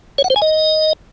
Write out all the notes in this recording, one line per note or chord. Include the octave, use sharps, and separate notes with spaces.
C#5
F#5
C5
G#5
D#5